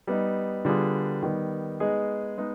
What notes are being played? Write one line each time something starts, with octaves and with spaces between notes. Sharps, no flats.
G3 B3 D#4
D3 G3 B3 F4 G#4
D#3 G3 B3
G#3 B3 D#4 G#4
G#3 B3 D#4